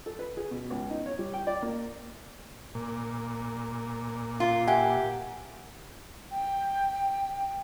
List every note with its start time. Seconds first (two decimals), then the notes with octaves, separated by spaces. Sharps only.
0.06 A4
0.19 B4
0.37 G#4
0.51 B2
0.70 C#2
0.90 D#4
1.06 C#5
1.19 G3
1.34 G5
1.47 D5
1.62 A#3
2.75 A#2
4.40 F4
4.68 G4 E5 F#5 G#5
6.31 G5